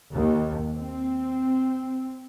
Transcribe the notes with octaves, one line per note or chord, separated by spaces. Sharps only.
D#2
C4